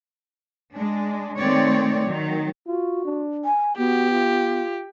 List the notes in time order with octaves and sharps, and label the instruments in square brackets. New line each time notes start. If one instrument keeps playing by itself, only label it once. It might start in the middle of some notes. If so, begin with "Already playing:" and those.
[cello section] G#3 D4
D#3 G#3 A3 C4 C#5 D5
D#3 F#3
[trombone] F4 [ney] F#4
[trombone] D4
[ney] G#5
[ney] B3 [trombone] F#4 [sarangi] G4
[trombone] F4